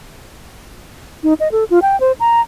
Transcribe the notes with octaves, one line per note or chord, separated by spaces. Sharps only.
D#4
D#5
A4
F4
G5
C5
A#5